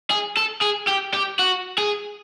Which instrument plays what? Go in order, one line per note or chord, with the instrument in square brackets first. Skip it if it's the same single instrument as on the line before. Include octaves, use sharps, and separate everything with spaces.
[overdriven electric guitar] G#4
A4
G#4
G4
G4
F#4
G#4